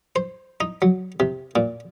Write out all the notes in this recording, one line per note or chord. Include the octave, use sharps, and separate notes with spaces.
C5
D#4
F#3
C3
A#2